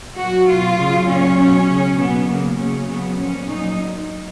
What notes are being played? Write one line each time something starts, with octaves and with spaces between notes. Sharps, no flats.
A#2 F#3 F#4
B2 F#3 F4
C#3 F#3
A#2 F#3 C#4
B2 F#3
C#3 F#3
B2 F#3 B3
C#3 F#3 A#3
C#3 F#3 C#4
C#3 F#3 B3
A#2 F3 C#4
A#2 F#3 D#4